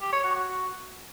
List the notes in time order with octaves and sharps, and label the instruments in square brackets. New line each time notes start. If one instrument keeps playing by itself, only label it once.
[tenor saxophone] G4
C#5
F#4
F#4